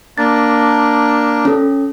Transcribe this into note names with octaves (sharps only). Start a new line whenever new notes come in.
A#3 D4 A6
C#4 A4